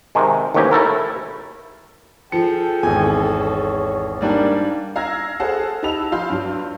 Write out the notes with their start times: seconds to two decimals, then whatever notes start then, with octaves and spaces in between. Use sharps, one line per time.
0.15 C3 D#3 G#3
0.55 A1 D#2 G#2 F#3 G4 G#5
0.71 A3 E4 A4 A#4
2.32 F3 G#4 A4 G5 C#7
2.83 G#1 E2 G#5
3.40 C#5
4.21 G#2 G3 A#3 D4
4.96 F5 A#5 E6 G#6 A#6
5.40 G#4 A4 C5 F5 F#5 A5
5.83 D#4 G4 A5 B5 E6 F7
6.12 F3 F4 F5 B5 C6 G6
6.30 G2 F#3